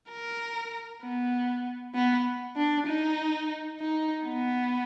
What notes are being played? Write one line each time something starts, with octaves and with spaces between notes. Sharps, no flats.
A#4
B3
B3
D4
D#4
D#4
B3